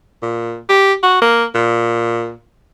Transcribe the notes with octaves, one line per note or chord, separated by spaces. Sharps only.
A#2
G4
F#4
A#3
A#2